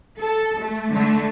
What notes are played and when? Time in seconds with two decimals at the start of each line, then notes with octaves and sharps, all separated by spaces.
0.19 A4
0.59 A3
0.90 D3 A3